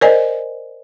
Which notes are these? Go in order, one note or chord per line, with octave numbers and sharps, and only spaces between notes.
A#4 C5 D5 D#5 G#5